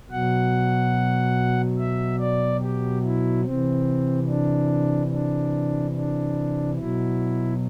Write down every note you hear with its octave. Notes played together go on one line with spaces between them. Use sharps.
B2 F#3 F#5
E5
D5
G4
E4
C3 C4
E3
D4
D4
D4
B2 F#3 E4